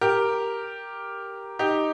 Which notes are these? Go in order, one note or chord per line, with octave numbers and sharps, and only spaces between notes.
G4 A#4
D#4 G4